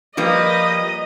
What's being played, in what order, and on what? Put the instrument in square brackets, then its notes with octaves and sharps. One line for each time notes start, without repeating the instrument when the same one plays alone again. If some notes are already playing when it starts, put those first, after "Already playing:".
[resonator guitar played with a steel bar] F3 G3 A#3 [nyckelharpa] B4 A#5 [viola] D#5